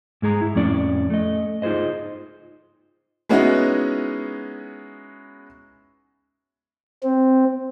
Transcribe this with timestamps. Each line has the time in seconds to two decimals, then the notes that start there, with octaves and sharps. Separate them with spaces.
0.22 G#2 G#3 G#4 A#5
0.41 E4
0.55 F2 A2 C#4 D5
1.10 A3 D#5
1.62 D#4 F4 G#4 C5 D#5
3.29 G#3 B3 C#4 D#4 E4 F#4
7.03 C4